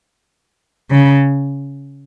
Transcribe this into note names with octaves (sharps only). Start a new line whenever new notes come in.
C#3